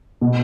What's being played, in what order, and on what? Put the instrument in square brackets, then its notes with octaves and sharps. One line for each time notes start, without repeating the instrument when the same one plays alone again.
[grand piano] B2